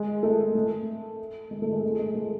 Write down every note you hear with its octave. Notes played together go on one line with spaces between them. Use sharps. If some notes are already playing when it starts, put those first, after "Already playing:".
Already playing: G#3
A3
A3
G#3
A3
G#3
A3
G#3
A3